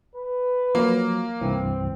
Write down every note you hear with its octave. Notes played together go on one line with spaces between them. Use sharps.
B4
F3 F#3 A#3
C2 G2 E3 C4